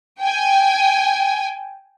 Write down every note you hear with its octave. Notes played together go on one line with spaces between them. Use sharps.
G5 G#5